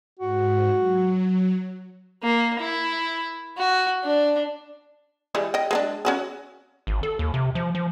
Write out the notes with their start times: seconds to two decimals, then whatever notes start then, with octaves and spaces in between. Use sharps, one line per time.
0.20 G#2 F#4
0.78 F#3
2.23 A#3
2.60 E4
3.57 F#4
4.04 D4
5.35 E3 G3 G#3
5.54 D#5 G5
5.71 G#3 B3 D4
6.05 C#4 F#4 G#4
6.87 G#1
7.03 A4
7.19 D#2
7.34 C3
7.55 F3
7.75 F3